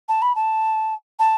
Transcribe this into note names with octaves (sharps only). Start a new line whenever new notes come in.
A5
B5
A5
A5